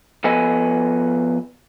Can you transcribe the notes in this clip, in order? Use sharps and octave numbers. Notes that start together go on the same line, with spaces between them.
F3 B3 A4 B4 D#5 G#5